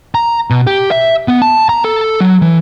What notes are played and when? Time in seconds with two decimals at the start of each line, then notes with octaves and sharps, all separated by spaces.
0.15 A#5
0.50 B2
0.67 G4
0.91 E5
1.28 B3
1.42 A5
1.69 A#5
1.84 A4
2.21 F#3
2.42 E3